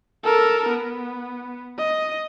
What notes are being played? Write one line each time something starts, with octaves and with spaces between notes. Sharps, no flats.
A4 A#4
B3
D#5